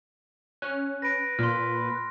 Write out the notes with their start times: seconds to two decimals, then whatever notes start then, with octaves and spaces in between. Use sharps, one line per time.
0.62 C#4 F#6
1.02 B4 A#6 D7
1.39 A#2 C6 F6